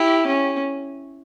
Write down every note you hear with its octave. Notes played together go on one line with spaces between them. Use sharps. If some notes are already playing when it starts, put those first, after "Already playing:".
Already playing: E4 G4
C#4